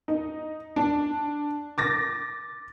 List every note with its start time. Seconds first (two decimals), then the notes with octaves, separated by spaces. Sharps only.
0.08 D#4
0.76 D4
1.78 D6 A6 A#6